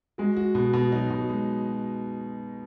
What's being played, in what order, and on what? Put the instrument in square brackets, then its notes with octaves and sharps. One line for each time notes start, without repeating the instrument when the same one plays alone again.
[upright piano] G#3 [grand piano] F#4
[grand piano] F#4
B2
B2
[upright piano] F#3 [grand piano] D#4
[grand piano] B2
G#3